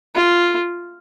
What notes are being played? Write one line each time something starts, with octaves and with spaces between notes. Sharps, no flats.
F4